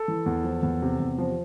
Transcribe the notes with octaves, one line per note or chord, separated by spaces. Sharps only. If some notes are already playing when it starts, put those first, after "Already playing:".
Already playing: A4
E3
E2
F3
E2
C3
E2
F3